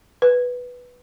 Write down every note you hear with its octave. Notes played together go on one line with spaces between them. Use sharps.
B4